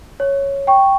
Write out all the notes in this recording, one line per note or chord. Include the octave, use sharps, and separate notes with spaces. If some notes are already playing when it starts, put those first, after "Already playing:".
C#5
G5 C#6